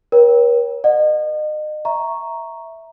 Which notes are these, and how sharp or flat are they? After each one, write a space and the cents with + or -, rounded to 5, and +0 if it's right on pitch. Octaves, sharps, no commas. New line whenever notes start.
A#4 +45 C#5 -5 G5 -5
D#5 -35 F#5 -25
E5 +0 A#5 +0 C#6 +0